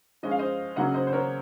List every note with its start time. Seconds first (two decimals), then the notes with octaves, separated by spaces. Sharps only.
0.23 F3 G#3 C#4 D#5
0.31 F5
0.39 C5 D#5
0.76 C#3 F#3 A#3 C#4 D#5 F#5
0.94 C5 D#5
1.07 C5
1.13 A#4 C#5